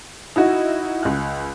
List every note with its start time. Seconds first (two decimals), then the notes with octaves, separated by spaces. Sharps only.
0.36 D#4 E4 F#4
1.03 C#2 F#6